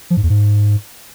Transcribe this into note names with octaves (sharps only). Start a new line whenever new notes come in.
F3
G#2
E2
G#2